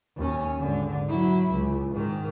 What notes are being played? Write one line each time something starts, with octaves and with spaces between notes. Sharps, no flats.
D#2 C#4
G#1 D3
F#3 E4
C#2
G#2 D#3